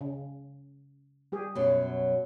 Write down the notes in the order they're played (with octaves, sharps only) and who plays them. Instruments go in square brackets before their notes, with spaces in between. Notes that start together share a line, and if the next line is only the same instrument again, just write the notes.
[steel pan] C#3
G3 G4 G#4
[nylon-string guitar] F#2 B2 F#3